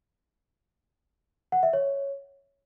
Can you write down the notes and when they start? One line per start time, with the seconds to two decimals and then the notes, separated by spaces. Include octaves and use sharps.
1.52 F#5
1.63 E5
1.73 C#5